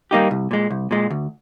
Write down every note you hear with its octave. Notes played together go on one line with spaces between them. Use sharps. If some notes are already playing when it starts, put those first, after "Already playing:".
G3 A#3 D#4 G4
C2
A#2 G#3
C2
A#2 G#3
D2